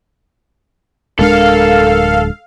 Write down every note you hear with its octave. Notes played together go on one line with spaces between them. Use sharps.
D1 G#3 D4 A4 A#4 F5